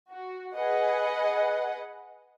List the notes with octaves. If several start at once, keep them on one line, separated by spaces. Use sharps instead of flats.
F#4
G#4 B4 D#5 F#5